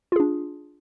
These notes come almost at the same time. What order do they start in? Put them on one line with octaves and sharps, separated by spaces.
F4 G#4 D4